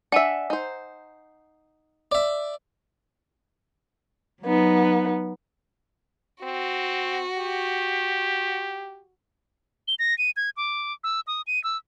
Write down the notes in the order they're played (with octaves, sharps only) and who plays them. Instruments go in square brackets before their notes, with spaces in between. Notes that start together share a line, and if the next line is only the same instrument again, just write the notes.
[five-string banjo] D4 E5 [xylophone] F#5 G#5 E6
[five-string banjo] D#4 C5
[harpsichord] D5 E5
[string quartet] F#3 B3 D#4
[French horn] C4 [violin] F#4
[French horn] G4
[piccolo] G7
A#6
D#7
G#6
D6
E6
D#6
D#7
E6